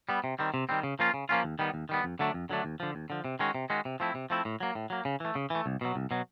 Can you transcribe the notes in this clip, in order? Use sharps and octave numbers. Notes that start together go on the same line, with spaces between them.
G3 B3
C3
D#3 G3 C4
C3
D#3 G3 C4
C#3
F3 A#3 C#4 F4
C#3
F3 A#3 C#4 F4
D#2
D#3 G3 B3
D#2
D#3 G3 B3
F2
D3 F#3 A3 D4
F2
D3 F#3 A3 D4
D#2
D3 F3
D#2
D3 F3
C3
D#3 G#3 C#4 F#4
C3
D#3 G#3 C#4 F#4
C3
F3 A3 C4 E4
C3
F3 A3 C4 E4
A2
F#3 A#3
A2
F#3 A#3
C#3
E3 A3
C#3
E3 A3
C2
B2 F#3
C2
B2 F#3